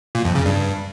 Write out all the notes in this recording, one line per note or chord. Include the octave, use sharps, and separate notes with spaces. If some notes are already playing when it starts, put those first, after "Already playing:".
A#2
F2
C#3
G2